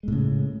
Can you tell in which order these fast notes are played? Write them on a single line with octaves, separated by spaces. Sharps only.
G#3 A2 C#3